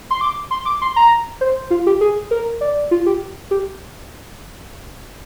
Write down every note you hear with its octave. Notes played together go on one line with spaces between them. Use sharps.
C6
D6
C6
D6
C6
A#5
C5
F4
G4
G#4
A#4
D5
F4
G4
G4